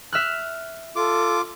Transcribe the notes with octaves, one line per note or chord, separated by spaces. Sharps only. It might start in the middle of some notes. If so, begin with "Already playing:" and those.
E5 F6 F#6
F4 A4 D6